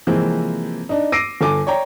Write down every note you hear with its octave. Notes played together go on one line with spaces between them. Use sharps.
C3 E3 F3 G#3 A#3 C4
D4 D#4
D6 E6 A#6 C7 D7 D#7
G1 A4 G#5 D6
C#5 D5 G5 A#5